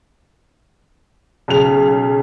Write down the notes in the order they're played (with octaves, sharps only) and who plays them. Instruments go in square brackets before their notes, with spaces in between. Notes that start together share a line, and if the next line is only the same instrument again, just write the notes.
[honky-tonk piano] B1 C#3 F7